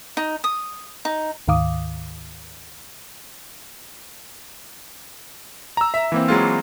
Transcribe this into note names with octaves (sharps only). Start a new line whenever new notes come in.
D#4
D#6
D#4
D2 G#2 D#3 F5 D6 D#6
A#5 E6
E5
E3 A#3 C4
F#3 G#3 F4